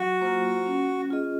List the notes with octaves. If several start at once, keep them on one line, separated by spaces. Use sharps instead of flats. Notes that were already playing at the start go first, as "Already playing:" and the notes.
Already playing: F#3 F#4
A#3 F4 C5
C#4
F4 G#4 D#5